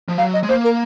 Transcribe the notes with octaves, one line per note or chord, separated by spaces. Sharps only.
F3
F#3 F5
D#5
G#3
A#3 C5
A#4